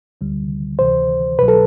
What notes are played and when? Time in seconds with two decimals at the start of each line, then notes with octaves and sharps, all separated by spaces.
0.21 D2 D3 G3
0.79 D2 C3 E3 C5
1.39 C2 B2 F#3 B4
1.48 A4